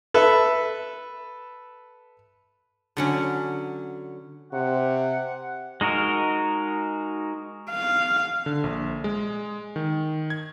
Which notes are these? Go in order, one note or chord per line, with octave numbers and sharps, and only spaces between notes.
A4 B4 E5
D3 F#3 C#4
C3 F#5
G#3 D#4 F#4 A#4
F5
D3
A#1
G#3
D#3
G#6